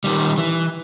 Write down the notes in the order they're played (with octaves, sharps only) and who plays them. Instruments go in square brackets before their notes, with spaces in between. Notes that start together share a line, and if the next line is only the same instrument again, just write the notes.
[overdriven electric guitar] D#3 G3
E3